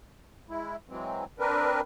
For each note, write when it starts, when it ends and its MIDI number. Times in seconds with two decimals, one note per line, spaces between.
0.49 0.76 56
0.49 0.76 64
0.89 1.24 52
0.89 1.24 54
0.89 1.24 56
0.89 1.24 60
1.39 1.81 60
1.39 1.81 62
1.39 1.81 70
1.39 1.81 71